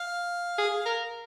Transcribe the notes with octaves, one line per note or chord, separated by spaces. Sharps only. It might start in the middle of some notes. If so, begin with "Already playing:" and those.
Already playing: F5
G#4
A#4